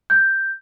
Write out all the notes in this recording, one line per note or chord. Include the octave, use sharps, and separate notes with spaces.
G6